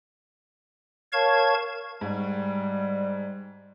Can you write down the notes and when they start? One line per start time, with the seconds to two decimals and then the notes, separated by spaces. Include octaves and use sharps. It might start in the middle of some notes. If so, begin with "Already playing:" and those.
1.13 A#4 C#5 F5 A5 C#6 G#6
2.01 G#2 G3